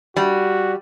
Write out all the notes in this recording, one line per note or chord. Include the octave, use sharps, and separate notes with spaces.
G3 F#4